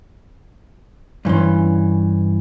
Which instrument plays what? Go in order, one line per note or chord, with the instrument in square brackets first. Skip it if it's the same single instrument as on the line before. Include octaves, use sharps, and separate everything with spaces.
[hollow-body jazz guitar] G2 E3 C#4 C6